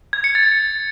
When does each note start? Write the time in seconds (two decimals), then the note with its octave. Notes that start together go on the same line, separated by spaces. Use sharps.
0.13 G#6
0.24 C#7
0.35 A6